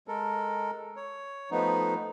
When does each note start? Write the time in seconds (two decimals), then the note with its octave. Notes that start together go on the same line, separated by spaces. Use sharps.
0.08 G#3 A4 A#4
0.97 C#5
1.51 F3 A3 B3 D#4